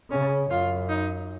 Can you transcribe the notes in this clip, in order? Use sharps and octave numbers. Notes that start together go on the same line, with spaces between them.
C#3 C#4
F#2 F4
D#4